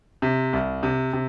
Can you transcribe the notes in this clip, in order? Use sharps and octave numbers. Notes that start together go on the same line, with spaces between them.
C3
C2
C3
C3